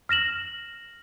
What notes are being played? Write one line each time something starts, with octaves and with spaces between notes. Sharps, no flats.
F6 A#6 E7 F#7